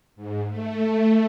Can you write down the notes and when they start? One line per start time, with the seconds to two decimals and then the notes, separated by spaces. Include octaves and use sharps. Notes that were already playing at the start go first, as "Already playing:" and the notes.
0.16 G#2
0.48 A3